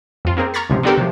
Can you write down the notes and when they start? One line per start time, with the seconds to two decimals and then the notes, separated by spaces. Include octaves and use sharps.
0.25 F2 F4
0.37 A#3 C4 G#4 A#4
0.54 A#5 C#6 F6 G#6 A6 B6
0.69 C#2 G#2 C3 F3
0.83 B3 C4 D4 G4 A4 A#4
0.97 C3 F3